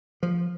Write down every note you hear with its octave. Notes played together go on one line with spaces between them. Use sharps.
F3